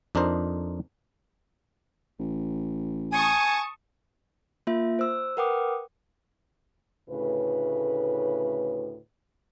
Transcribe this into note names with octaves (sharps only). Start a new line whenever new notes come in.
F2 D4 D#4 A#4 C5
A1
G#5 A5 C#6 D#6
A#3 F4 E5
C5 E6
A#4 B4 F#5 G5 D6 D#6
D2 A2 C#3 B4